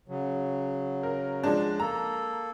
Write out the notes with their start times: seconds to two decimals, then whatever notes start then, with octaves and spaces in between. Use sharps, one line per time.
0.08 C#3 F#3
1.03 A#4
1.43 F3 G#3 D4
1.80 A#3 A4 A#5